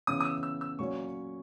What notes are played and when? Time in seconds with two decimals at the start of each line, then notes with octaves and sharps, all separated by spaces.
0.07 C#3 E3 B3 D#6
0.21 D#6
0.25 E6
0.43 E6
0.61 E6
0.79 A#2 F#3 C#4 C#6